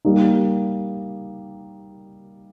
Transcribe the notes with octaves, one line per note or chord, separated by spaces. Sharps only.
G3 A#3 D#4